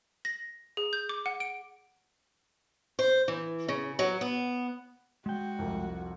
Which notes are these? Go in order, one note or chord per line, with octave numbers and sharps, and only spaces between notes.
A#6
G#4
G6
D6
F#5
D7
C5
E3
C#3
F#3
B3
G#3 F#4 G5
C2 F2